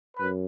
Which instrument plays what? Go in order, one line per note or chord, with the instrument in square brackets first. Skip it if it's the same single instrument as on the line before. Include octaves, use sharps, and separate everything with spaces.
[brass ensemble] F#2 B4